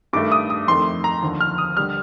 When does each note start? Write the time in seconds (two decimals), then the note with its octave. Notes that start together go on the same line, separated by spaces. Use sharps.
0.13 G2 D#3 A3 D6
0.32 D#6
0.50 D#6
0.68 F2 D#3 A3 C6
1.04 A#5
1.23 D#2 D3 F3
1.41 F6
1.58 D#6
1.77 D3 G3 F6